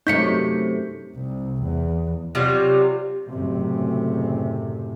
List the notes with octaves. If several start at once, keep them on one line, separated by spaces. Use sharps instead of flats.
F#2 C3 A3 D#4 G6 B6 C#7
C2
E2
C3 F#3 G3 F4
F#1 A2 C3